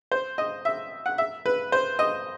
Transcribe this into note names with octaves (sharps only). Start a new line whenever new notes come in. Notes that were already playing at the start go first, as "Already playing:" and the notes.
C5
D#5
E5
F#5
E5
B4
C5
D#5